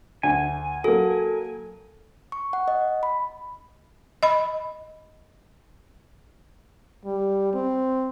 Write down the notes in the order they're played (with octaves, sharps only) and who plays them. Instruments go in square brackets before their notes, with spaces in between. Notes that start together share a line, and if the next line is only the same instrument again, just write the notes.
[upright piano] D2 [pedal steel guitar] G#5
[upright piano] F#3 A#3 [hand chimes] A4
[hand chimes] C#6
F#5
D#5
B5
[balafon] D#5 B5
[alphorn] G3
C4